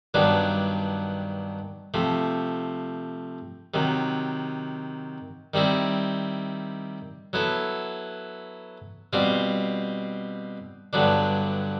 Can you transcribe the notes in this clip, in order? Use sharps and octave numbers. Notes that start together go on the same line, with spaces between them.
G2 D#3 F#3 B3 D4
C3 F3 A3
C3 D#3 F#3
D#3 G3 C4 E4
F#3 B3 E4 A4
B2 G3 C4 F4
G2 D3 F#3 B3 D4